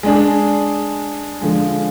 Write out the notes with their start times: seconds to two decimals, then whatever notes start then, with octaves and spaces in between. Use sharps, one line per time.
0.03 G#3 D4 G#4
1.41 D3 F3 G#3